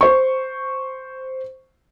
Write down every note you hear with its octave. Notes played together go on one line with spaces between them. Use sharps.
C5 C#6